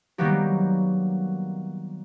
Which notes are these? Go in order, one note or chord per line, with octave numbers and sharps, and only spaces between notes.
D#3 F#3 G3 A#3 B3 G4